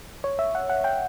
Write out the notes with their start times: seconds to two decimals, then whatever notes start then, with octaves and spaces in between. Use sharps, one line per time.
0.24 C#5
0.39 E5
0.55 F#5
0.70 F#5
0.84 G5